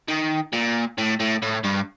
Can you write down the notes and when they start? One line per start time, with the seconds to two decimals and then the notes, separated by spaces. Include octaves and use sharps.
0.08 D#3
0.53 A#2
0.98 A2
1.20 A2
1.43 A2
1.65 G2